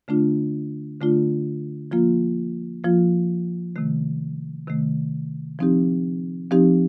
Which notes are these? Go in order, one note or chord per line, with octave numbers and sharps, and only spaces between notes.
D3 A3 D4 F4
D3 A3 D4 F4
F3 A#3 F4
F3 A#3 F4
C3 D#3 A3
C3 D#3 A3
F3 C4 D#4 G4
F3 C4 D#4 G4